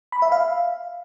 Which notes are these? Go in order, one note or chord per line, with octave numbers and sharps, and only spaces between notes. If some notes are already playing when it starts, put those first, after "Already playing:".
B5
E5
F5